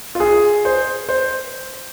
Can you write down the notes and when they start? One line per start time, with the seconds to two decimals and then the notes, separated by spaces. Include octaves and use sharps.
0.15 F4
0.20 G#4
0.65 C5
1.09 C5